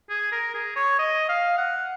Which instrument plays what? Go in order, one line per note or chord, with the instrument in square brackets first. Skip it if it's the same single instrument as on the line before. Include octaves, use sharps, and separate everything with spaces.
[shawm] G#4
A#4
G#4
C#5
D#5
F5
F#5